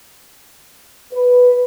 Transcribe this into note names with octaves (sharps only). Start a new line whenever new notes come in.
B4